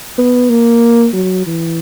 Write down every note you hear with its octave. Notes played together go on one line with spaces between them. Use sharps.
B3
A#3
F#3
E3